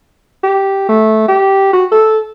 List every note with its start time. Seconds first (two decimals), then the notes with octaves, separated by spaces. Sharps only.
0.43 G4
0.88 A3
1.28 G4
1.73 F#4
1.92 A4